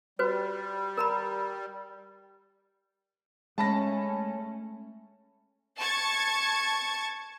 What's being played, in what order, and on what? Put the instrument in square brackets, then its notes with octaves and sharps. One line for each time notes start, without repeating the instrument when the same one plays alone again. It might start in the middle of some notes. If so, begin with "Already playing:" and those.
[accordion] G3 [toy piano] F#4 B4 C5
[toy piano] A#4 A#5 B5
[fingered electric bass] G#3 [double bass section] A3 C#4 [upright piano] A5 B5 A#6
[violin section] A5 C#6 G#6 A6